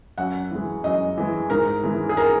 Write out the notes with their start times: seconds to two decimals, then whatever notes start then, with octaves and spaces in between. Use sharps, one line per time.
0.18 F#2 F#5
0.51 E3 G#3
0.84 F#2 D#5
1.18 E3 G#3
1.50 G#2 A#4
1.83 E3 G#3
2.09 G#4
2.17 A#4